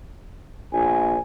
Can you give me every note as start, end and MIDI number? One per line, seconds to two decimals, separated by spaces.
0.73 1.16 34
0.73 1.21 80